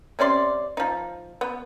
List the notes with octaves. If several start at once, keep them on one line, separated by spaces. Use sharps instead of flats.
C3 C#4 D5 C6
F3 D#4
B3